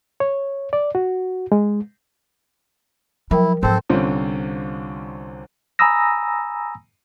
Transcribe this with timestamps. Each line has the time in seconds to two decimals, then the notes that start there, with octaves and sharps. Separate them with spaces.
0.20 C#5
0.73 D5
0.95 F#4
1.52 G#3
3.31 F3 F#3 E4 A#4 G5
3.63 G#2 F3 C4 A4 C5
3.89 C2 D3 C4 C#4 F4 C5
5.79 G#5 A#5 B5 D#6 E6 A#6